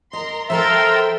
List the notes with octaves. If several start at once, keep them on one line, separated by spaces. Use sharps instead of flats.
A#4 D#5 A#5 C6
F3 A4 A#4 E5 G5 A#5 C6 A6